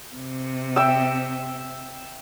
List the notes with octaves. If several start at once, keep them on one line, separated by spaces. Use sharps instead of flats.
C3
E5 G5 E6